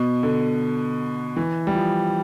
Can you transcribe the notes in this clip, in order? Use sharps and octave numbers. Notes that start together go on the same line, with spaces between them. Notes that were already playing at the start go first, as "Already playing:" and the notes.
Already playing: B2
D3
E3
G3
F3